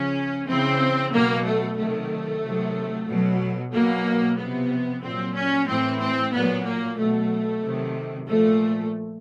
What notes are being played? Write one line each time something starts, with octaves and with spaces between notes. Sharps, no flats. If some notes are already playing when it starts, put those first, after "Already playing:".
Already playing: C#3 F3 C#4
C#3 E3 C4
B2 F#3 A#3
A3
C3 D#3 F#3 A3
C3 D#3 F#3
B2 F#3
B2 F#3 A#3
C3 F3 B3
A#2 F#3 C4
C#4
A2 E3 C4
C4
A#2 F#3 B3
A#3
B2 F#3 A3
C3 D#3 F#3
A#2 F3 A3